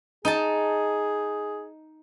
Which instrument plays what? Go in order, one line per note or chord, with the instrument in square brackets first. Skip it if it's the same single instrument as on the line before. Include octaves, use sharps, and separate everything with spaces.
[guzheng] D#4 A5 [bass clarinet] G#4